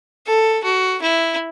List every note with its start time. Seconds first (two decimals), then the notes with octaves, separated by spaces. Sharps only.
0.27 A4
0.64 F#4
1.02 E4